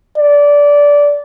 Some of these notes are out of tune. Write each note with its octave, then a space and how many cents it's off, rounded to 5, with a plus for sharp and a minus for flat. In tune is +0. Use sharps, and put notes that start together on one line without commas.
D5 -15